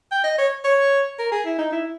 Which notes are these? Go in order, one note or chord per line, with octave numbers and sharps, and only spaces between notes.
G5
D#5
C#5
C#5
A#4
G#4
E4
D#4
E4